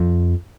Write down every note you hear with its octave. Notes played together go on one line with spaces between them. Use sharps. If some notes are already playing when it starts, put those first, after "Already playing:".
Already playing: F2